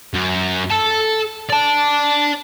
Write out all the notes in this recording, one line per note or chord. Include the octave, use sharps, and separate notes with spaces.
F#2
A4 A5
D5 A5